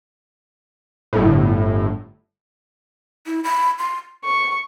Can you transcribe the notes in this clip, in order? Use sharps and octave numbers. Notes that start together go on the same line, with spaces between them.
G1 A2
E4
B5
C6
C#6